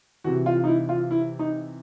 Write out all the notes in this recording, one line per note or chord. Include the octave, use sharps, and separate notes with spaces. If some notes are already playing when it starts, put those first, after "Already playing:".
C3 E3 F#4
F4
D#4
E4
F4
E4
D#4